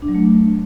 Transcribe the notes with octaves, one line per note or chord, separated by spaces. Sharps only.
D4
F#3
A3